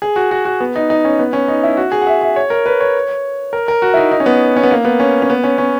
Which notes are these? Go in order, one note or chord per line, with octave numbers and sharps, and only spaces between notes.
G#4
F#4
F#4
F#4
B3
D#4
D#4
C#4
B3
C#4
D#4
E4
F#4
G#4
F#5
E5
E5
C#5
A#4
B4
C#5
A#4
A#4
F#4
E4
D#4
D#4
C#4
B3
C#4
B3
A#3
B3
C#4
C#4
B3
C#4
C#4